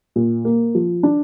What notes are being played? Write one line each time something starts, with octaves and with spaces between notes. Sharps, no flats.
A#2
A#3
F3
D4